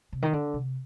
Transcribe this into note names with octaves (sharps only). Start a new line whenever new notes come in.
C3
D#3
D3
C3